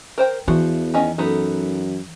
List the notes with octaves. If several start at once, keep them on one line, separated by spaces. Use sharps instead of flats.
A#4 C5 G5
E2 E3 F3 F#4
D#3 C#4 D#5
F#2 B3 D#4 A4